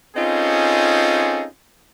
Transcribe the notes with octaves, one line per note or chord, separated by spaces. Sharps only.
C4 C#4 D#4 F4 G#4 A4